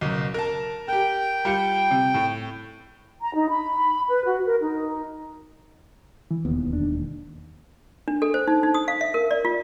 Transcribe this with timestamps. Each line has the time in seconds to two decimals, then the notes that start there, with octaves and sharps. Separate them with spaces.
0.01 F#1 B1
0.34 A#4 A5
0.88 G4 A#4 G5
1.45 G3 F4 C#7
1.91 C3
2.14 A2
3.22 A#5
3.35 D#4
3.50 B5
4.09 B4
4.26 F#4
4.45 A#4
4.61 D#4
6.31 E3
6.45 E1 D#2 B3
6.70 F2 D4
8.08 D4
8.22 A4
8.34 C5
8.48 D#4
8.63 D#4
8.74 D#6
8.88 F5
9.01 E5
9.14 A#4
9.31 D5
9.45 F4